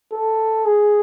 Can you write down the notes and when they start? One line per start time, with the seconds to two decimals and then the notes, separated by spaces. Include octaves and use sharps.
0.12 A4
0.65 G#4